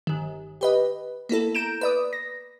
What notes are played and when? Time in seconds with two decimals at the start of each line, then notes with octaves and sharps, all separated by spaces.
0.07 G1 D#3
0.61 G4 B4 D#5
1.29 A#3 B3 E4 A4
1.55 A#5 G6 D7 E7
1.81 B4 D5 D#6
2.13 A#6